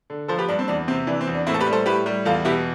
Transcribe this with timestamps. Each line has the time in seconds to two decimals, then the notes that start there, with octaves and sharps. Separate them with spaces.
0.10 D3
0.28 F3 A4 C5
0.38 G4 B4
0.48 G2 D4
0.59 C4
0.68 E2 D4
0.88 C3 C4
1.07 E3 D4
1.21 C4
1.27 E2
1.34 D4
1.47 A2 C4 E4
1.54 A4
1.60 G4 B4
1.67 G3
1.73 A4 C5
1.86 A2 G4 B4
2.06 G3
2.25 E2 F4 A4
2.45 B2 E4 G4